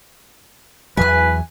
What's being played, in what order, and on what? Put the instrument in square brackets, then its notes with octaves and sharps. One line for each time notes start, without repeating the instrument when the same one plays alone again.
[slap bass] E2 E3 F#3 [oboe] B4 [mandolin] G#5 F#6